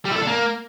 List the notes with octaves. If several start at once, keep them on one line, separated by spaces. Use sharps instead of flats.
G3
E4
A4
D4
A#3